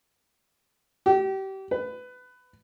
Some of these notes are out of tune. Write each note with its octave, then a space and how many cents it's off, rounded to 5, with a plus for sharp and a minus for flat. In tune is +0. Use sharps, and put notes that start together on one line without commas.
G4 -30
B4 +20